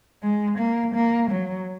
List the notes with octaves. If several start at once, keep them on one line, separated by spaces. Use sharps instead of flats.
G#3
A#3
A#3
F#3